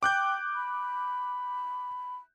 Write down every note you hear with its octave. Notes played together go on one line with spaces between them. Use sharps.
G5 D6 F#6 G6
B5